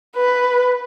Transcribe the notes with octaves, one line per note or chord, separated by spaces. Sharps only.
B4